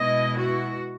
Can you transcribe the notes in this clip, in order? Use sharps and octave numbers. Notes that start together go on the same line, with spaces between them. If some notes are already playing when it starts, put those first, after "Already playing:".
Already playing: B2 G#3 B3 E4 D#5
F#4